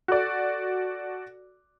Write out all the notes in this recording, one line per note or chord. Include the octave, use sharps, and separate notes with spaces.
F#4 A4 D5